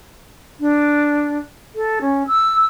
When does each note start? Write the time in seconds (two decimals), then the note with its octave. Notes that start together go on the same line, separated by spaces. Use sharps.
0.60 D4
1.75 A4
2.01 C#4
2.27 E6